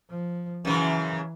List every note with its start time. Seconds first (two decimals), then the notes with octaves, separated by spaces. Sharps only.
0.10 F3
0.65 F#2 C#3 E3